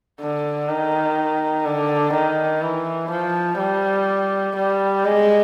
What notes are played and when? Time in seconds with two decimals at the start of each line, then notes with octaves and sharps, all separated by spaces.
0.21 D3
0.69 D#3
1.66 D3
2.14 D#3
2.63 E3
3.11 F3
3.59 G3
4.56 G3
5.05 G#3